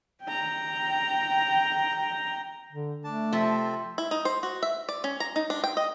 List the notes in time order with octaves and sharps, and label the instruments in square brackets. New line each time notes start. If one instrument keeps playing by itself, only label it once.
[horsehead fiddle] G5 A#5
[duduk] D3
[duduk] A3 [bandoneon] D4 A5
[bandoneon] C3 C4 A4 [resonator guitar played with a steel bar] F3 E5
[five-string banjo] E4
D#4
C5
F#4
E5
D5
C#4
A#5
D#4
D4
G5
D#5